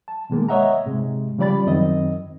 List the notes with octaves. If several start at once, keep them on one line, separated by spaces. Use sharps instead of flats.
A5
B2 D#3 G#3 A#3
C#5 D#5 E5 F#5 A#5
G#2 C3 G#3
C#3 F3 G3 D5 B5 A6
F#2 D#3 C4 D#5